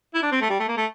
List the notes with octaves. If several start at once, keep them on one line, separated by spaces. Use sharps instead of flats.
E4
D4
C4
A3
G3
A3
A#3
A3